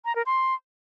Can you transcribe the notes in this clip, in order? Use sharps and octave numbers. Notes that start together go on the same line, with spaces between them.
A#5
A#4
C6